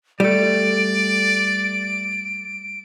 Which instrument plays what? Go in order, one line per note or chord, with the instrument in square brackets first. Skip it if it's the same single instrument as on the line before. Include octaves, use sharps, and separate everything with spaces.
[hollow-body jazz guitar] G3 A3 [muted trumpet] D5 [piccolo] D7